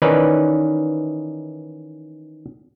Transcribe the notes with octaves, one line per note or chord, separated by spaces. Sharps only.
D#3 E3 C#4 D#4 B4 D5